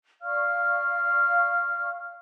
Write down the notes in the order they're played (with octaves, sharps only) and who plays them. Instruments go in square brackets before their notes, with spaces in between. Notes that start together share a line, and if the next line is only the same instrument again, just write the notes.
[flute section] D5 F5 C#6 F6